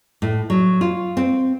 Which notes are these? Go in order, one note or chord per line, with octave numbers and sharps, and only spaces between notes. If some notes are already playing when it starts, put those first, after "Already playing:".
A2
F#3
F4
C4